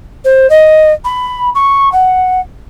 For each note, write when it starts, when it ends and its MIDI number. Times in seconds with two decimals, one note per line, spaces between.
0.24 0.49 72
0.49 0.92 75
1.04 1.49 83
1.54 1.91 85
1.91 2.40 78